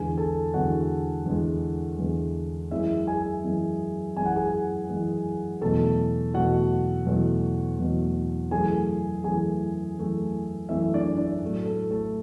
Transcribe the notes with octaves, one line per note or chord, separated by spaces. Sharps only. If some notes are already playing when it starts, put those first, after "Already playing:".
Already playing: E2 D3 G#3 G#4 G#5
A4 A5
E2 D3 G#3 F#4 F#5
E2 D3 G#3
E2 D3 G#3
F#2 E3 G#3 E4 E5
G#4 G#5
F#2 E3 G#3
F#2 E3 G#3 G#5
F#5
G#4 G#5
F#2 E3 G#3
E2 B2 F#3 A3 A4 A5
E2 B2 F#3 A3 F#4 F#5
E2 B2 F#3 A3
E2 B2 F#3 A3
F#2 E3 A3 G#4 G#5
F#2 E3 A3 G#4 G#5
F#2 E3 A3
F#2 E3 A3 E4 E5
D4 D5
D4 D5
A2 F#3 A3
A3 A4
A3 A4